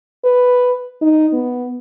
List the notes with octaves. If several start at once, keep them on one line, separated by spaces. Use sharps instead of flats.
B4
D#4
B3